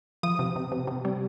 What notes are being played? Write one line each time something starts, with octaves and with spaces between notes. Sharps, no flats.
F3 D#6
C3
C3
C3
C3
G3